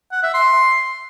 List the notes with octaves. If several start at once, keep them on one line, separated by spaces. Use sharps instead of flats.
F#5
E5
C6